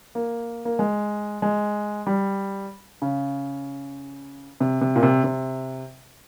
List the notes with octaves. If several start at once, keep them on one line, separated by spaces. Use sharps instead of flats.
A#3
A#3
G#3
G#3
G3
C#3
C3
C3
A#2
C3
C3